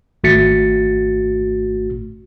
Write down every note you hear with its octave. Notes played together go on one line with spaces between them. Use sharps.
G#1 A3 F#4 A6 B6 C#7